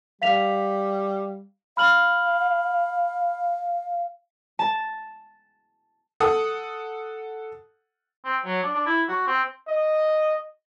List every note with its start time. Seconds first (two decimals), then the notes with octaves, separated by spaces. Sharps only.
0.22 G3 F5 B6 F7
1.77 F5 B5 F6 F#7
4.59 A5
6.20 A4 F#5 D#6
8.25 C4
8.45 F#3
8.63 D4
8.74 D4
8.86 E4
9.09 F#4
9.27 C4
9.68 D#5